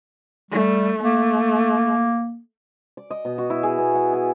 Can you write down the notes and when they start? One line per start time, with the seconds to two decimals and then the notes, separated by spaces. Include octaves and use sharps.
0.51 G3 A3
1.03 A3 A#3
2.97 D5
3.11 D#5
3.25 B2
3.38 F#4
3.50 E4
3.63 G#4
3.78 B3
3.95 F#5
4.13 G#5